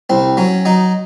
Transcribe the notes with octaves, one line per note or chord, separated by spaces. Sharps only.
C2 C4
F#3 C#4
F#3 D#4